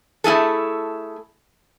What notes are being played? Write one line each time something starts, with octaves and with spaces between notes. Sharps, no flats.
A3 E4 G#4 A4